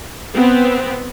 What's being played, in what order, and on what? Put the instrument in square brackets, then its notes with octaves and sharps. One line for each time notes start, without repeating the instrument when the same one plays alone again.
[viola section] B3 C4